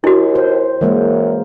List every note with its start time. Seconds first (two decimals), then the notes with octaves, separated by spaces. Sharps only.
0.04 D#2 E4 F#4
0.35 C5
0.81 F#2 E3 G#3 A#3